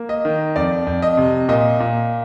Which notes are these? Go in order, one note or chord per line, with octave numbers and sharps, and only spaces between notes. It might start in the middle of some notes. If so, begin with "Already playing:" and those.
Already playing: A#3
D#5
D#3
F2 D5
F2
D#5
C3
A#2 D#5
A#2